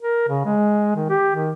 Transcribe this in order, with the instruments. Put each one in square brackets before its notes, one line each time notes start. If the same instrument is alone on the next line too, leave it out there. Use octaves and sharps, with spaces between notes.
[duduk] A#4
C#3
G#3
D#3
G4
D#3